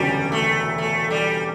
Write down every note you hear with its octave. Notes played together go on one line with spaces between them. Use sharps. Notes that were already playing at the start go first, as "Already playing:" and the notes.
Already playing: E1 D2 C#3 F#3 G3 C#4
A3
A3
G3